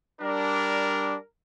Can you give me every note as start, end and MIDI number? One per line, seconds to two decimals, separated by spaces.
0.21 1.16 55
0.21 1.16 62
0.21 1.24 70